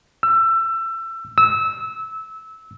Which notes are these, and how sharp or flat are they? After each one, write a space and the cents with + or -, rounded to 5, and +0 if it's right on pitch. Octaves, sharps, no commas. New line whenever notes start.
E6 +25
E6 -20